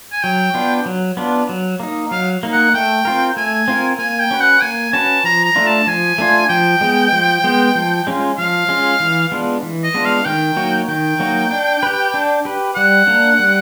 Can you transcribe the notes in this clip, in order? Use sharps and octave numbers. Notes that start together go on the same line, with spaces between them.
G#5
F#3 G5
B3 D4 F4
F#3
B3 D4 F4
F#3
A#3 D#4
F#3 F5
A#3 D#4
F#5
A3 G5
C4 F4 A#4
A3 G#5
C4 F4 A#4
A#3 G#5
G5
C#4 F#4 B4
F#5
A#3 G#5
C#4 F#4 B4 A5
F3 A#5
A#5
A3 D4 F4
A5
F3 G#5
A3 D4 F4
F3 G5
G#3 B3
F3
G#3 B3
F3
G#3 C#4 F4
F3 F5
G#3 C#4 F4
E3
G#3 B3 D4 F4
E3
D#5
G#3 B3 D4 F4
F5
D#3 G5
F#3 A#3 D#4 F#4
D#3 G5
F#3 A#3 D#4 F#4
D4
G4 B4
D4
G4 B4
G3 F#5
A#3 D4
G3